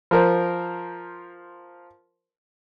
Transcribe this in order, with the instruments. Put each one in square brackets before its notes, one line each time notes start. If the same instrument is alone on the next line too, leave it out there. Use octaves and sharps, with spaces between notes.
[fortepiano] F3 A#4 C5